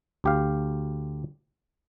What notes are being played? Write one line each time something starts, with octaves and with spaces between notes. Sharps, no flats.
D2 G4 F5